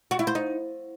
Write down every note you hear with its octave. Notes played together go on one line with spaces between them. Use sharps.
F#4
E4
C5
D#4